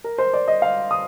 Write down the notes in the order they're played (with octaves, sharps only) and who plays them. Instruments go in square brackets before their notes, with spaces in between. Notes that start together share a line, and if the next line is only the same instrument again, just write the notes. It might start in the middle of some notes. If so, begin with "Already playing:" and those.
[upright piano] A#4
C5
D5
D#5
F5
D#6